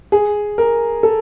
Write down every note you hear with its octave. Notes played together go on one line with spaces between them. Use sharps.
G#4
A#4
A4